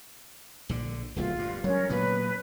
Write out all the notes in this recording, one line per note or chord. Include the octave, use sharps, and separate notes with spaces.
A#1 D3
D1 B1 A3 F4
G2
F#3 G#3 C#4 A#4 C#5
A#2 F#3 B3 B4